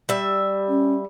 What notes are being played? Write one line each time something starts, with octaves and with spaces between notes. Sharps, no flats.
G3 E5
C#4